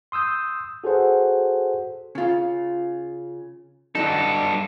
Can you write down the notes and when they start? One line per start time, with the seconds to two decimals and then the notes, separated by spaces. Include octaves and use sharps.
0.12 C6 D#6 E6 G6
0.84 F#4 G#4 A4 B4 C5 F#5
2.15 C#3 F4
3.95 G2 F#3 D#4 A4